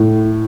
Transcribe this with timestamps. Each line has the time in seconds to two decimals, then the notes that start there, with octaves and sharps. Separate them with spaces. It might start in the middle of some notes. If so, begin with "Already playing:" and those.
Already playing: A2